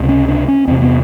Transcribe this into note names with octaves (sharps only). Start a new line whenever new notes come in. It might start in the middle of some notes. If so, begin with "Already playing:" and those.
Already playing: C#2 C3
C#4
D4
C#4
E2 C3 C4
B3